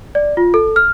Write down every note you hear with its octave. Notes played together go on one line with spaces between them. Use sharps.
D5
F4
A4
F6